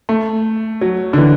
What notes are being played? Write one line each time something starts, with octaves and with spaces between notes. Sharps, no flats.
A3
F#3
D3
E3